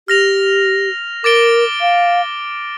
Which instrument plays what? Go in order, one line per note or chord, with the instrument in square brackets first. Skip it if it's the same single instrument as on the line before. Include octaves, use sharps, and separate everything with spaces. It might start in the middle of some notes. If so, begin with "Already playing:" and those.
[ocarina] G4 [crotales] F6 A#6 F7
[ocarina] A#4 [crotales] D6 A6 D7 G7
[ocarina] F5